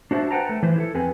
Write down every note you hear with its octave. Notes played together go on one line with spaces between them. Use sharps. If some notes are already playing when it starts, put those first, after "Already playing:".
D4 F#4 C5 E5 A5
B4 C5 F#5 G5 A5 A#5
A3
E3 B4 C5
E4 G4 A4
F2 B3 C4 G#4 B4 G#5